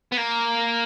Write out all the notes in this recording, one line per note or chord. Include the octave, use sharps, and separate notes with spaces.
B3
A#3